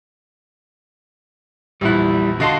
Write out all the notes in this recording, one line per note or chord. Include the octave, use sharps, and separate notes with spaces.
A#1 E2 G3 E4 F#6
D3 F#4 D#5 F5 A5 C6